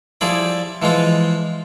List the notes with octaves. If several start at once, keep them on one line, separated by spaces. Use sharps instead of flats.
F3 G3 E4 G#4 D5
E3 F3 G#3 F4